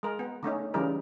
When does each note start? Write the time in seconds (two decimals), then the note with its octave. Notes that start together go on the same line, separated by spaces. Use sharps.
0.03 G#3 A#4
0.19 B3
0.43 D3 A3 C#4 D#4
0.74 C#3 E3 G3 D#4 A#4